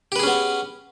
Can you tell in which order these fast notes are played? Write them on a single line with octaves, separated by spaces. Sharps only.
G4 B4 G#4 C#4 B3